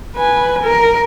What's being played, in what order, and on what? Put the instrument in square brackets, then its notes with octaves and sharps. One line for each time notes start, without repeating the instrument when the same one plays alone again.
[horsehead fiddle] B4 G#5
A#4